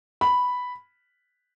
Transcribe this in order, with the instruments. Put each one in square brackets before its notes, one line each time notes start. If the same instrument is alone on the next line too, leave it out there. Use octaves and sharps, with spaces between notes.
[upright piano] B5